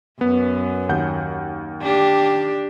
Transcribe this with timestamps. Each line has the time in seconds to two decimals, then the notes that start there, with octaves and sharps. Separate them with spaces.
0.21 F#2 B3
0.89 D#2 F#5 G6
1.81 D4 G4